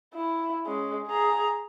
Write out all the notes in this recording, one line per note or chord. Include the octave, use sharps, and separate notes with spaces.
E4
G#3 C#4
G#4 A#5